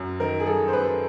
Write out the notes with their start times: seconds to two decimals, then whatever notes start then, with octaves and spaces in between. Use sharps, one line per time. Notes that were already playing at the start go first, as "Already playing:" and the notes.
Already playing: F#2 F#3
0.20 D#3 A#4
0.40 G#4
0.46 F#2 A4
0.68 C5
0.73 F#2 B4